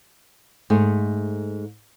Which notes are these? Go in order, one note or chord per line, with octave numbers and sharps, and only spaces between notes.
G#2 A3 G#4